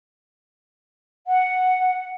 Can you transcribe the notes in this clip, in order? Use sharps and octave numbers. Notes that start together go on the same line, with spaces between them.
F#5